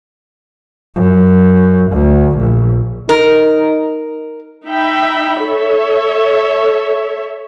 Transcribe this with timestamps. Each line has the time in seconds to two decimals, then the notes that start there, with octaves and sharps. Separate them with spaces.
0.95 F#2
1.90 D2
2.38 A#1
3.09 D#4 A#4
4.66 D#4 E5 G5 B5
5.43 A4 C#5 E5